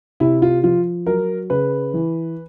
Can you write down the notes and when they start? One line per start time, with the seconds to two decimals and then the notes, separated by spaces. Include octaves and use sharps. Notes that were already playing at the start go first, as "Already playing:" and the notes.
0.20 C3 E4
0.42 F4
0.63 F3 F4
1.06 F#3 A#4
1.50 C#3 B4
1.94 E3